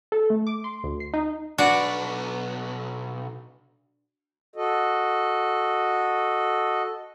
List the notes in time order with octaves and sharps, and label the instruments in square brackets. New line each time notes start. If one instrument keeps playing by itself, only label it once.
[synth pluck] A4
A3
D6
C6
D2
C7
D#4
[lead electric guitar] B1 B4 [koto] D4 F#4 D5
[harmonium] F#4 A4 D#5